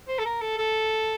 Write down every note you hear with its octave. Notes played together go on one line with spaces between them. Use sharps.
C5
A4
A#4
A4
A4